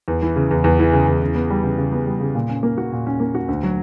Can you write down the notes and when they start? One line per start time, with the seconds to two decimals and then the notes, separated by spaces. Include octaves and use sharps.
0.08 E2
0.22 E3
0.36 C#3
0.51 E2
0.64 E2
0.79 E3
0.93 C#3
1.08 E2
1.22 C#3
1.35 B3
1.50 G3
1.64 C#3
1.78 C#3
1.92 B3
2.07 G3
2.20 C#3
2.35 A#2
2.49 C#4
2.63 A#3
2.78 F#4
2.92 A#2
3.07 C#4
3.20 A#3
3.35 F#4
3.48 D2
3.63 F#3